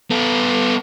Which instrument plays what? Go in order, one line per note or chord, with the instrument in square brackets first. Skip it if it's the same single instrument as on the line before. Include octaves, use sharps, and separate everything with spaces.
[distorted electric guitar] B3 A4